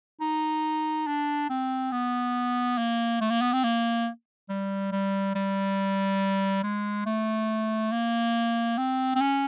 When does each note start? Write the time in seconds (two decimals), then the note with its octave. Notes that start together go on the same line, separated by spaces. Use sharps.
0.21 D#4
1.07 D4
1.50 C4
1.92 B3
2.78 A#3
3.21 A3
3.31 A#3
3.42 B3
3.53 C4
3.64 A#3
4.49 G3
4.92 G3
5.35 G3
6.63 G#3
7.06 A3
7.92 A#3
8.78 C4
9.16 C4
9.21 C#4